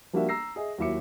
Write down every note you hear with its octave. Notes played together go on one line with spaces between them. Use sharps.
F3 G3 A#3 D4 F#4 E5
A#5 E6 A#6 C7
G#4 D#5 E5
D#2 F#3 E4 E5 D6 C#7